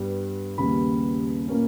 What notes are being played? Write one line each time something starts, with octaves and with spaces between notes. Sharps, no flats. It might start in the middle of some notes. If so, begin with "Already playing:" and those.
Already playing: G2 G3 B3
D#2 C#3 G3 B3 B5
A#2 A#3 C#4